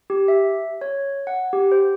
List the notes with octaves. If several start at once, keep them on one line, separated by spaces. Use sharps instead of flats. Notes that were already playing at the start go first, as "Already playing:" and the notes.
G4
E5
C#5
F#5
G4
C5